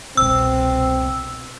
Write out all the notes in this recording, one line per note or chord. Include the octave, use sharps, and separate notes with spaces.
F1 C2 B2 C4 E6